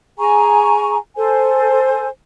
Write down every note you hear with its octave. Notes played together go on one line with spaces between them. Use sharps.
G#4 G#5 A#5 C#6
A4 C5 G#5